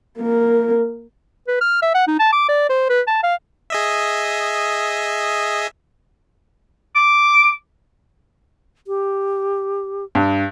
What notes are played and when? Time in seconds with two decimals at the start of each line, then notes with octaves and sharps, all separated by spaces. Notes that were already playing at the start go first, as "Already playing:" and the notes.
0.18 A#3 A#4
1.48 B4
1.61 F6
1.82 E5
1.94 F#5
2.07 D#4
2.19 A5
2.33 D6
2.49 D5
2.70 C5
2.89 B4
3.07 A5
3.23 F5
3.70 G#4 D#5 E5
6.96 D6
8.87 G4
10.15 G2